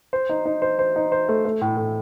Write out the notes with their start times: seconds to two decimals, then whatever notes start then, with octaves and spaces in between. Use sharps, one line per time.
0.13 C5
0.29 D#4
0.45 D#4
0.62 C5
0.79 C5
0.96 D#4
1.12 C5
1.29 A3
1.45 A3
1.61 A2
1.77 A2